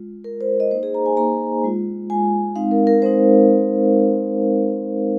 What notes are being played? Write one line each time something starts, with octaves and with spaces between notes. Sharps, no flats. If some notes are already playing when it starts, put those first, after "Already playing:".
Already playing: G#3 F4
G#3 F4 A#4
C5
D#5
A#3 D#4 C5
G#4
A#5
G#5
A#3 D#4 A#5
G#3 F4
G#3 F4 G#5
G#3 C4 D#4 F5
A#4
A#4
G#3 C4 D#4 C5